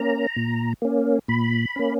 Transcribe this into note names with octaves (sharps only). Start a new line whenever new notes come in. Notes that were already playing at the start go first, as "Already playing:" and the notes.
Already playing: A#3 C#4 A#5
A#2
A#3 C#4
A#2 B5
A#3 C#4